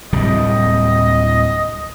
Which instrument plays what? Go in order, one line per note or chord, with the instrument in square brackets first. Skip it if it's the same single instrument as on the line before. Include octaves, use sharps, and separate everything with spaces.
[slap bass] D1 C3 G3 [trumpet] D#5